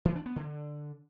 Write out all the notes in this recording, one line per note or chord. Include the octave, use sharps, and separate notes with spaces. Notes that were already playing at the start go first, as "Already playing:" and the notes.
E3
D4
B3
D3